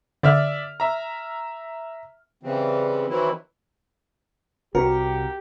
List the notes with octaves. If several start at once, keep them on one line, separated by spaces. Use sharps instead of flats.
D3 D5 E5 F6
E5 A#5
C#3 E3 G3 C4
D#3 E3 F#3 C4 E4
C2 F#4 G4 A#4